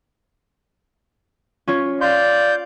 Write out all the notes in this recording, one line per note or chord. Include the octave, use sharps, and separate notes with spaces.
C#4 F4 C#5
D5 F5 C6 G6